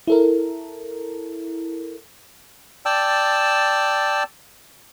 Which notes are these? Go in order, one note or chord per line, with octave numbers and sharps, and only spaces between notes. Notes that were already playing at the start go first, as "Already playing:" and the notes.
E4 A4 A#4
D5 G5 A5 E6